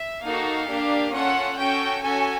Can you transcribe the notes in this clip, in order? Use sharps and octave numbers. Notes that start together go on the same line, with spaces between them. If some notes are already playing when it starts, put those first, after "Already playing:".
Already playing: E5
A#3 D#4 F#4 A4 F5
A#3 D4 G4
C#4 F4 A4 F#5
C#4 F#4 A4 G5
C#4 F#4 A4 G#5